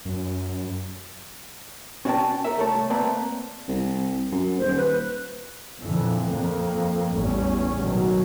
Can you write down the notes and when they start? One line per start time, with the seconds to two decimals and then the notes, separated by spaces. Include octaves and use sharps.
0.05 F#2
2.05 C#4 F#4 D5 F5 G5 A5
2.45 A4 A#4 E5
2.57 C2 A3 C#5 A5
2.90 A3 A#3 C4 B4 D5 A5
3.68 C2
4.32 F#2
4.59 D#1 C5
4.77 B4
5.80 F2 A#2 D3 E3
6.31 F2 A#3
7.13 A1 E2 A2 G3 C#4
7.80 B2 D#3 F#3